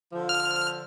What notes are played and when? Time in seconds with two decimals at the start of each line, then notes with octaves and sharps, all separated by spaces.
0.12 D3 F3
0.29 F6